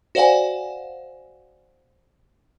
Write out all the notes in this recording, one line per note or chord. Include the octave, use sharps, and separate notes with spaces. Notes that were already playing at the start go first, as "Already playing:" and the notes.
F#4 C5 D5 F5 F#5 G#5